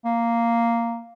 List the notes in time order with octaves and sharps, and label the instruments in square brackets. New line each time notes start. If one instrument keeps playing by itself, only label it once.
[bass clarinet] A#3